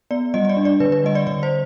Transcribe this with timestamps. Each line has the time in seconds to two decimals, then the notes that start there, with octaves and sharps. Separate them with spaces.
0.11 B3 D5
0.34 G3 D#5
0.45 D#5
0.49 D5
0.57 D4
0.65 D5
0.80 D3 B4
0.92 B4
1.04 G3 D#5
1.15 D5
1.27 D3 D5
1.43 C5